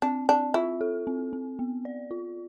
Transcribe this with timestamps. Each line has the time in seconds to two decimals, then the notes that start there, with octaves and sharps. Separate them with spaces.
0.02 C4 D4
0.29 C4 D4
0.54 E4 F4
0.81 A4
1.07 C4
1.33 C4
1.59 B3
1.85 D5
2.11 F4